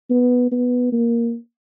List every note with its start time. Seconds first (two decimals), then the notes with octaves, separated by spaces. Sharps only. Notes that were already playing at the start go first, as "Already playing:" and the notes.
0.10 B3
0.52 B3
0.92 A#3